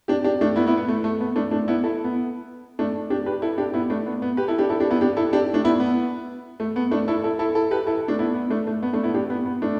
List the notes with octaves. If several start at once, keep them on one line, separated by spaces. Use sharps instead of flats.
D4 G4
D4 G4
A3 D4
B3 E4
B3 E4
B3
A3
A3
B3
A3 D4
A3 D4
B3 E4
E4 A4
B3
A3 D4
D4 G4
G4 B4
E4 A4
D4 G4
B3 E4
A3 D4
B3
B3
G4 B4
E4 A4
D4 G4
E4 A4
D4 G4
B3 E4
D4 G4
E4 A4
D4 G4
A3 D4
B3 E4
B3
A3
B3
A3 D4
E4 A4
E4 A4
E4 A4
E4 A4
G4 B4
E4 A4
A3 D4
B3 E4
B3
A3 D4
A3
B3
A3 D4
B3 E4
D4 G4
B3
B3
A3 D4